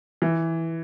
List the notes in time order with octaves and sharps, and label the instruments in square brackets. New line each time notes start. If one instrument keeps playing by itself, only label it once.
[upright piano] E3